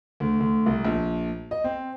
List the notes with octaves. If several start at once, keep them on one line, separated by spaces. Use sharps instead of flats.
D2
D2
C2
A#1
D#5
C4